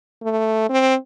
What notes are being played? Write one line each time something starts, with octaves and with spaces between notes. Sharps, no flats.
A3
C4